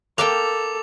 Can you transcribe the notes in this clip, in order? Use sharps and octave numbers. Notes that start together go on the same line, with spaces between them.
A#3 A4 F5 G5 D6 F7